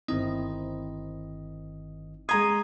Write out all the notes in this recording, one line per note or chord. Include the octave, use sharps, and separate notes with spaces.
G1 D#3 C4 D#4 E4 D#5
G#3 A#5 C6 D#6 G#6